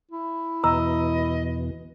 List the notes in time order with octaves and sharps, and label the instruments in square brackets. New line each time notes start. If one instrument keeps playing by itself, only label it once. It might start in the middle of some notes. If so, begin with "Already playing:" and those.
[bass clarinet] E4
[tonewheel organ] E2 B2 E3 [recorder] D#5 [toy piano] A#5 E6